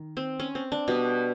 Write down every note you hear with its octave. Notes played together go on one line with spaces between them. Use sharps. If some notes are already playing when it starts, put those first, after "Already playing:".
Already playing: D#3
C4
C#4
C4
D4
B2 G3 B3